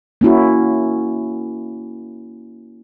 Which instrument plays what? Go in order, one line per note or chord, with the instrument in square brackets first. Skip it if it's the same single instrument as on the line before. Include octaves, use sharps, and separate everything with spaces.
[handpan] A#3 C#4 E4 F#4